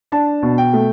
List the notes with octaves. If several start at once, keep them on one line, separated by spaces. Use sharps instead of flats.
D4 A5
B2
G5
A3